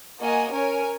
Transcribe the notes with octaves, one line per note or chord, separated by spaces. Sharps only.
A#3 F#4 D#5 G#5
C#4 A#4 C#5 G#5